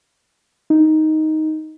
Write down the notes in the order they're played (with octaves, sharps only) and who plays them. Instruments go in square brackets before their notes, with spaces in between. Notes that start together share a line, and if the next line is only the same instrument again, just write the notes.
[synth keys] D#4